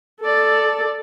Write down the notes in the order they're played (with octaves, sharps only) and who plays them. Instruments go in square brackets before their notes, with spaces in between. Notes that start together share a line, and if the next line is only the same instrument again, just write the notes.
[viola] A4 D5